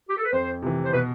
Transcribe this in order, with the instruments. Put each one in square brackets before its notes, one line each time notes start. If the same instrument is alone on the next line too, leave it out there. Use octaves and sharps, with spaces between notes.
[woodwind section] G4
A4
B4
[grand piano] F2 [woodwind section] C5
[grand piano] C3 E3
[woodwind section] C5
[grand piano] B2 [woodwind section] B4